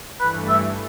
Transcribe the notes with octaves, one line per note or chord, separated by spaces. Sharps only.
G2 E3 A3 B4
E5